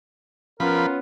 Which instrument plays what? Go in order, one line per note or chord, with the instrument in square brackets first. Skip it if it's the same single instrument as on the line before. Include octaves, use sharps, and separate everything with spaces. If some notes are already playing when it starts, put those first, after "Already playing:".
[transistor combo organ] F3 B5 [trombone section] B3 F4 [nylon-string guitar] C#4 [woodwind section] A#4